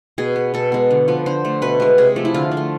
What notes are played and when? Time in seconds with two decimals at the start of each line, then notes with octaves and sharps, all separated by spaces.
0.18 B2 G#4
0.36 B3
0.54 B2 A4
0.72 G#3 B3
0.91 D3
1.08 F3 B3
1.26 D3 C5
1.45 A3
1.62 B2 B4
1.80 G#3 B3
1.98 C3 G#4
2.16 F3 A3
2.25 E4
2.34 D3 F4
2.52 F3
2.57 A3